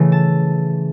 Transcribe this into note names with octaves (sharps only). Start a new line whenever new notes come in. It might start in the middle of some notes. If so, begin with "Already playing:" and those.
Already playing: C#3 E3 A3
A5